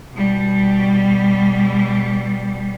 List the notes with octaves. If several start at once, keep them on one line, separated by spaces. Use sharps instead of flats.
B2 G3